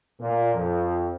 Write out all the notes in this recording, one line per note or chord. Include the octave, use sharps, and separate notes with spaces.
A#2
F2